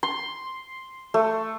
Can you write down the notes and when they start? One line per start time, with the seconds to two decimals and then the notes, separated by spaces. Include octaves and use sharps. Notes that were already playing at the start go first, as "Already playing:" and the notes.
0.03 C6
1.14 A3